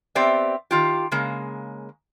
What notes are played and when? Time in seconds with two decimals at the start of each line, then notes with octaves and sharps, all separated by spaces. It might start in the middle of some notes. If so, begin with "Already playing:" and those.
0.15 B3 C4 G4 D5 E5
0.71 D#3 F4 G4
1.12 C#3 G#3 A#3